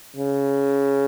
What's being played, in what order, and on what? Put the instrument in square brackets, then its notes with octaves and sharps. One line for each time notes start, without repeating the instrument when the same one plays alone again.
[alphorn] C#3